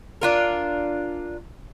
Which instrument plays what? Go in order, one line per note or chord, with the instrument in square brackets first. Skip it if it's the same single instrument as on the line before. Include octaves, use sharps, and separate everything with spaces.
[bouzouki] D4 F4 A#4